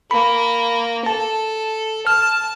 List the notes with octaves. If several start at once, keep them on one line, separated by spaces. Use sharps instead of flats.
A#3 B5
A4 A5
A5 F6